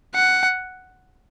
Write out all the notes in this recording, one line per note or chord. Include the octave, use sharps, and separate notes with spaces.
F#5